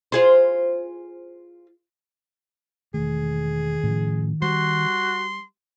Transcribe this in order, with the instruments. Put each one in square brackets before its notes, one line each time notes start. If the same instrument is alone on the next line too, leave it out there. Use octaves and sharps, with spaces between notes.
[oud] F4 G#4 C5
[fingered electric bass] E1 A3 [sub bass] D#3 [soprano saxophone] G#4
[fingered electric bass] A2 C#3 F3
[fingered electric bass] G3 [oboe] F#4 [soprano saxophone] C6